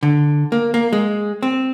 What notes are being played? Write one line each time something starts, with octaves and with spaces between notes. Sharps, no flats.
D3
A#3
A#3
G#3
C4